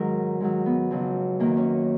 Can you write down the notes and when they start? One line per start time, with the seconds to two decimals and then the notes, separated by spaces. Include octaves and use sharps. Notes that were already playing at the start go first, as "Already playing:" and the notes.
Already playing: G#2 D#3 F#3 A#4
0.41 G#2 D#3 F#3
0.66 B3
0.91 F2 C#3 F#3
1.40 F#2 D#3 F#3 A#3
1.57 C#4